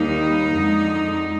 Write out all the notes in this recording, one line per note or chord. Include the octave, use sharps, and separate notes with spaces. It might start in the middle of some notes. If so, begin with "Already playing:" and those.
Already playing: D#2 D#3 G3 A#3 D#4
F2 D3 G#3